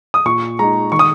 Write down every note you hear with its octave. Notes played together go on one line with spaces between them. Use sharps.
D#6
A#2 C#6
G#3 D#4 A#5
D#3 C#6
D#6